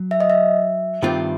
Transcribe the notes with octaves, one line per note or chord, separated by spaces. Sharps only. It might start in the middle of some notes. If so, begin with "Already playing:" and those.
Already playing: F#3
E5
D#5
E5
G2 D#3 G3 C4 F4